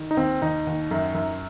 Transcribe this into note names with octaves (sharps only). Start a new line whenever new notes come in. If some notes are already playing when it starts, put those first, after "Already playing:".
Already playing: D#3
D#4
D#2 C4
D#2 D#4
D#2
F#2
F#2